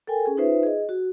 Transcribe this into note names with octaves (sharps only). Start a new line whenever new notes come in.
A4 A#4 G5 G#5
C#4 G#4
D#4 F4 B4 C5 E5
G#4 D#5
F#4